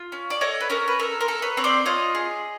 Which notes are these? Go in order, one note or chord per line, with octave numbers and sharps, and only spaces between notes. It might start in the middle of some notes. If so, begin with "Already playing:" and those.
Already playing: F4
C#4
D5
A4 C#5 D#5
B4
C#4 A#4
B4
A4 A#4
A#4 C5
A4
B4 C#5
C4 C#5
C5 D5
F4 C#5 D#5
G#4